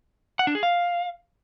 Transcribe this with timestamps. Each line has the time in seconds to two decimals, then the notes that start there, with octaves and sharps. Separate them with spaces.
0.39 F#5
0.47 D4
0.55 G#4
0.63 F5